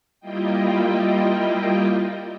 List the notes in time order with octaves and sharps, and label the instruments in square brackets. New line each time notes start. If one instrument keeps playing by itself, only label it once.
[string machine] G3 A#3 E4 F4 D#5 G5